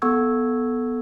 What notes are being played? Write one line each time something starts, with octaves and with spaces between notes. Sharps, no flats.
B3 A4 F#5 C#6 E6 G#6